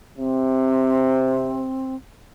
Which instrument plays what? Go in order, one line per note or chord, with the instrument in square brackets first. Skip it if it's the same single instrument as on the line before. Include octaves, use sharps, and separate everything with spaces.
[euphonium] C3 [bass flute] C4